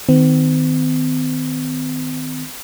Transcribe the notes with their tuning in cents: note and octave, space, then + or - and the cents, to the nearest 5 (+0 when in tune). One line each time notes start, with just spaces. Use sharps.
D#3 +0 C4 -45